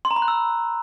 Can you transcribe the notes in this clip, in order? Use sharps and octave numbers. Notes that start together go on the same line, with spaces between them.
C6
A#5
B5
F#6
E6